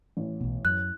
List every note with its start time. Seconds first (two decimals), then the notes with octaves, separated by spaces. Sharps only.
0.17 A1
0.41 B1 B2
0.65 F#2 F#6